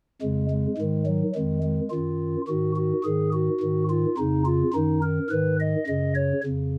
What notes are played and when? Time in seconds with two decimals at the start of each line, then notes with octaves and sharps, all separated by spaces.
0.21 F2 C#3 G#3
0.50 G#3
0.77 G#2 D#3 G#3
1.06 F#3
1.35 F2 D#3 G#3
1.63 G#3
1.90 F#2 D#3 F4
2.48 G#2 D#3 F#4
2.76 F#4
3.04 G#2 D#3 G#4
3.33 F#4
3.61 G#2 D#3
3.90 F4
4.17 F2 C#3 D#4
4.46 F4
4.74 F#2 D#3 D#4
5.03 A#4
5.30 G#2 D#3 B4
5.60 D#5
5.87 F#2 C#3 D#5
6.16 C#5
6.43 F2 C#3